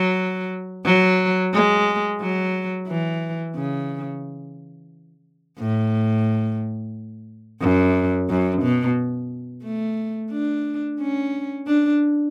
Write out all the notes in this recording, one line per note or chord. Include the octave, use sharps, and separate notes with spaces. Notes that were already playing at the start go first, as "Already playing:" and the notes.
Already playing: F#3
F#3
G#3
F#3
E3
C#3
A2
F#2
F#2
B2
A3
D4
C#4
D4